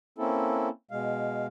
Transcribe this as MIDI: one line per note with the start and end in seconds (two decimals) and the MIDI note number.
0.18 0.69 58
0.18 0.69 60
0.18 0.69 61
0.18 0.69 64
0.18 0.69 69
0.91 1.47 47
0.91 1.47 56
0.91 1.47 77